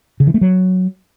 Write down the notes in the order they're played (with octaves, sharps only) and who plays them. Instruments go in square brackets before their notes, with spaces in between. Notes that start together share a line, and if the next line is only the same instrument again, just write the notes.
[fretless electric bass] C#3
E3
A3
F#3